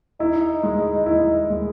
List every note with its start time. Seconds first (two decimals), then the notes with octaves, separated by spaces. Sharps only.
0.20 D#4 E4
0.63 G#3
1.06 E4
1.50 G#3